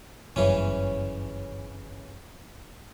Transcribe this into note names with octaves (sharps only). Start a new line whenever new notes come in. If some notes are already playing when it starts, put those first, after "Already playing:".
G1 F#2 C#3 E3 C#4